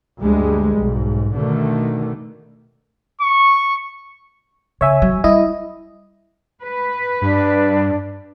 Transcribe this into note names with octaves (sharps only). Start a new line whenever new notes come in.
D2 G2 G3 G#3
B1 G#2
B2 D3 D#3 A3
C#6
C#3 C#5 E5 G#5
F#3
G3 E4 D#5
B4
G2 D4